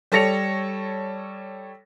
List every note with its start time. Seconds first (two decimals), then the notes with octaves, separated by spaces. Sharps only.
0.12 G3 A4 C#5 A#6 C#7 F7